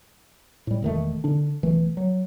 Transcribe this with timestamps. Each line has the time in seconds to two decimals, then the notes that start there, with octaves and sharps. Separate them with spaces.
0.67 A2 G3
0.82 E1 D#3 A3
1.24 D3 D4
1.63 B1 E3 A3
1.97 F#3